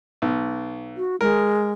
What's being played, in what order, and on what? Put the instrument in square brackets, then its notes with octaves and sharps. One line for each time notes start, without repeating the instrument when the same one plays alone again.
[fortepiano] B1
[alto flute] F#4
[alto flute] G#3 [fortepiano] A#4